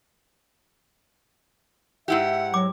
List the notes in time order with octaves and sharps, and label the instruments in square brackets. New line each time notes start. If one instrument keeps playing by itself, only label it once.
[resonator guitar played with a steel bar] G#2 E4 G4 [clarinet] E5 [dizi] F#5
[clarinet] F#3 [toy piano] D6